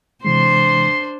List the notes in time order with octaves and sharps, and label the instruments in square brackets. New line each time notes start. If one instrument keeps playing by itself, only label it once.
[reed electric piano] C3 E3 G#3 [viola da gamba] D4 C5 [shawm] C6